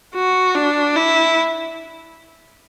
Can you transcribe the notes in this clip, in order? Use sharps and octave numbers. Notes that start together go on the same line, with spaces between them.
F#4
D4
E4